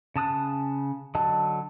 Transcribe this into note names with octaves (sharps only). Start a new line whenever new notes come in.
C#3 A5 D#6 F#6
D3 F#3 D#5 A5